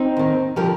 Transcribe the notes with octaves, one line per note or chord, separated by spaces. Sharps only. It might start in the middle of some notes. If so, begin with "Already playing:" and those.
Already playing: C4 D#4
D#2 D#3
D3 F3 G4 A#4